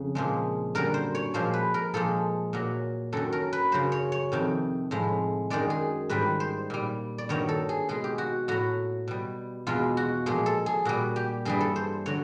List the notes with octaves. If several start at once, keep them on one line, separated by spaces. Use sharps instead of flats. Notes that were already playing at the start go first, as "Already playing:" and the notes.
Already playing: F2 C#3
A#2 F3 G#3
F#2 D3 G3 A#4
C5
C#5
A#2 F3 G#3 C5
B4
A#4
A#2 F3 G#3 A4
A#2 F#3
F#2 D#3 F#3 A4
A#4
B4
F#2 C#3 F#3 C5
C#5
C#5
F2 C3 D#3
A2 F3 G#3
F#2 D#3 G#3 D5
G#4
G#2 D#3 G3 B4
C5
A#2 G3
D5
G2 D#3 F#3 C#5
A4
G#4
B2 G#3 G#4
G4
F#4
A2 F#3 F#4
B2 G3
E2 B2 G#3 F4
F#4
A#2 F3 G#3 G#4
A4
G#4
A#2 G3 F#4
G4
G2 E3 G3 G#4
A4
C5
D3 F#3 C#5